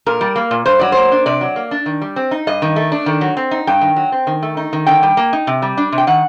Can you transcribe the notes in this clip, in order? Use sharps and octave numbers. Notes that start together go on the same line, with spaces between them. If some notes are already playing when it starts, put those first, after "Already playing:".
A#2 A#4
G3
A#3
A#2
G2 C5
F#3 D5
A#3 C5
D4
C3 D5
F#3
A#3
D4
D#3
G3
C4
D#4
G2 D#5
D#3
A3
D4
D#3
F#3
C4
D#4
G2 G5
D#3
F#3
C4
D#3
A3
D#4
D#3
D3 G5
G3
A#3
D#4
C3
G3
D4
C3
G5
D#3 F#5